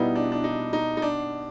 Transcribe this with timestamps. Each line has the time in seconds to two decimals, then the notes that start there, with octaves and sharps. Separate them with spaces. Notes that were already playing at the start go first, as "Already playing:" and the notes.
Already playing: B2 G3 B3 D#4 E4
0.16 D4
0.32 D4
0.44 D#4
0.73 D#4
0.97 D#4
1.02 D4